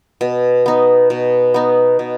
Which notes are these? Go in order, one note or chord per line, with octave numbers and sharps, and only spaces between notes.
B2
B3 D#4
B2
B3 D#4
B2